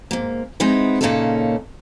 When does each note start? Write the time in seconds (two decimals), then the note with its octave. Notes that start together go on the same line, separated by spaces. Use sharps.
0.11 G#2 A#3
0.60 G#3 B3 C4 D#4 E4
1.01 A#2 C#3 A#3 C#4 D#4 A4